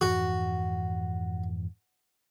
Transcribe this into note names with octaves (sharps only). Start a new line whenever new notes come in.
F2 G#2 E3 F#4